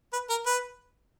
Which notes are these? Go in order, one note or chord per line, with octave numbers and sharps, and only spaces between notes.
B4
A#4
B4